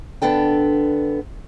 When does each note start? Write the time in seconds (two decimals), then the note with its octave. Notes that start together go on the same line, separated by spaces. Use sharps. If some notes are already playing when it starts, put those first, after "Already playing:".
0.22 D3 B3 D4 A4 G5